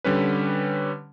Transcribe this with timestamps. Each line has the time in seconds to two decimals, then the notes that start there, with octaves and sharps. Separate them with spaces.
0.04 D3 G3 C#4 B4